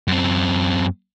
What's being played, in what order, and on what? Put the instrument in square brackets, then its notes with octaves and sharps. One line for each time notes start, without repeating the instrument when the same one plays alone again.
[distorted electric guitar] F#2 C4